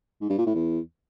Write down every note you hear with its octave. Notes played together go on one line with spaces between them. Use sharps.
G#2
G2
A#2
A2
E2